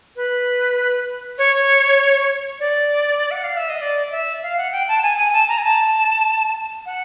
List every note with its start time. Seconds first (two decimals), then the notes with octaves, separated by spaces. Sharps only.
0.16 B4
1.38 C#5
2.60 D5
3.31 F#5
3.44 F5
3.57 E5
3.69 D#5
3.81 D5
4.12 E5
4.43 F5
4.57 F#5
4.72 G5
4.88 A5
5.03 G#5
5.18 G#5
5.33 A5
5.49 A#5
5.58 G#5
5.64 A5
6.86 F#5